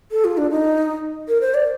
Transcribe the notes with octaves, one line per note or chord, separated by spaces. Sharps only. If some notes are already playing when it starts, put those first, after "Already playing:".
A4
F4
D4
D#4
A#4
C5
D5